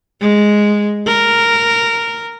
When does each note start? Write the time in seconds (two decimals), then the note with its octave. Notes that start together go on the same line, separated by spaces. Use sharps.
0.21 G#3
1.07 A#4